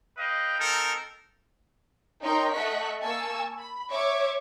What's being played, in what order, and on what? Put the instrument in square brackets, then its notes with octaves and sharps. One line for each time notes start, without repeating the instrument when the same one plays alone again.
[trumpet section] B4 D#5 F5 G5
C4 D#4 A4 A#4
[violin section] D#4 A#4 C#5 G5 A#5 C6
A3 D#5 E5 F#5 C#6 B6
A#3 G#5 A5 C#6 E6
B5
C#5 E5 C#6 D6 G#6